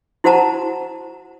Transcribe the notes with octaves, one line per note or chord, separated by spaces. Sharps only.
E4 F#4 C5 F#5 A5 A#5